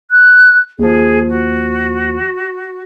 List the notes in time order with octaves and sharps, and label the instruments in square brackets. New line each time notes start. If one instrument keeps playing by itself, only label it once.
[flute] F#6
[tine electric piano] D#2 F3 [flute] G#4
[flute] F#4